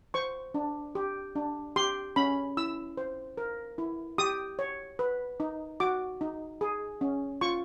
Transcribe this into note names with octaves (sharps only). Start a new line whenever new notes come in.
C5 C#6
D4
G4
D4
G4 C6
C#4 B5
E4 E6
C5
A#4
E4
G4 D#6
C#5
B4
D#4
F#4 D6
D#4
G#4
C#4
F4 C#6